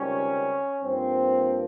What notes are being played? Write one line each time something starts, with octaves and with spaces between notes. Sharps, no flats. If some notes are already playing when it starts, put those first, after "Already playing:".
Already playing: C#2 C3 D#3 G3 C#4
G2 F3 A#3 C4